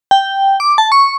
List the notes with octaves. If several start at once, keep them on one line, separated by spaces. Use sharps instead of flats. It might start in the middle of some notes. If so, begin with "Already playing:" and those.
G5
D6
A5
C#6